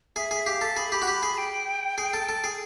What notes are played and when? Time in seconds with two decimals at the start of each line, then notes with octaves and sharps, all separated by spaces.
0.16 G#4 E5
0.31 G#4
0.46 G4 F5
0.61 A4
0.76 G#4 B5
0.92 G4
1.02 F#4
1.07 G4 B5
1.23 G#4
1.38 G5
1.98 G#4
2.13 A4
2.29 A4
2.44 G#4